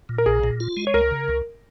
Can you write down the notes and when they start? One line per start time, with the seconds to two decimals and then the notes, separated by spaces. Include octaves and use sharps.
0.09 A#2
0.18 A#4
0.26 A#1 G#4
0.44 A#2
0.60 F4
0.77 G#3
0.87 C#5
0.94 C#2 A#4
1.11 C#3
1.28 C#2